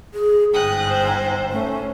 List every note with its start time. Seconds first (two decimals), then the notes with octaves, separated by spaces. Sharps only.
0.14 G#4
0.54 G1 G#2 G5 D#6 F#6
0.89 C5
1.51 A3 C#4